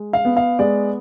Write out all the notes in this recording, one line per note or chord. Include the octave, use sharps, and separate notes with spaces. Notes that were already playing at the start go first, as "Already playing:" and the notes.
Already playing: G#3
F5
B3
F5
G#3 D5